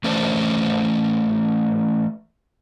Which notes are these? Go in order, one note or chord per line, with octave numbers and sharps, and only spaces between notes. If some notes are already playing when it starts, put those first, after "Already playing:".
E3 A3 C#4 C5 D5